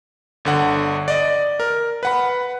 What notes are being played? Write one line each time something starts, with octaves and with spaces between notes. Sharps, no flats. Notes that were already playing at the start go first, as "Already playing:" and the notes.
G1 D3 F#5
D5 D#5
A#4
B4 F#5 B5